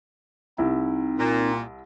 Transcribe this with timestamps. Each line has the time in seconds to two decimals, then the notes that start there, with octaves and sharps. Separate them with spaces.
0.58 C2 C4 D#4 E4
1.18 A#2